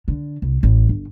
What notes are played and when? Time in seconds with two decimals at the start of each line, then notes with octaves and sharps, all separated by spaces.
0.08 D3
0.42 C2
0.63 A1
0.89 G1